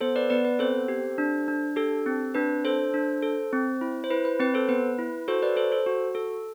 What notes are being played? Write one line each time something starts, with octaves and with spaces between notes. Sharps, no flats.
B3 A4 C5
B4 D5
B3 B4 D5
B4
C4 A4 C5
G4
D4
D4
G4 A4
C4
D4 B4
A4 C5
D4
A4
C4
E4
C5
E4 B4
B4
C4 B4
A4 C5
B3 B4
E4
F#4 A4 C5
B4 D5
A4 C5
A4 C5
F#4
A4